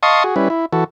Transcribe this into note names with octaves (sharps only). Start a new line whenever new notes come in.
D#5 F5 A5 C6 C#6 D#6
F#4 G#4
G3 C#4 E4 B4
E4
E3 F#4 A4